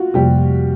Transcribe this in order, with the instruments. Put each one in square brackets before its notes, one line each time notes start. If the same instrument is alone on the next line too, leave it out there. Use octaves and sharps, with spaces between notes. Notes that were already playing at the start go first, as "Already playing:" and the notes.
Already playing: [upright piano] F4 F#4
[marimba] F2 C3 F3 A#3 [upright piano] G3 G4